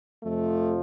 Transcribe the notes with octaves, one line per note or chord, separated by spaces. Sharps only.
F2 C3 F3 A3